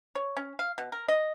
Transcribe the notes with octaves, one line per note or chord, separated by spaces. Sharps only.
C#5
C#4
F5
B2
A#4
D#5